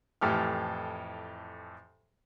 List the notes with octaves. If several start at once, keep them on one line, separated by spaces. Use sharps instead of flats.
F2 A2 E3 G4 A4 F6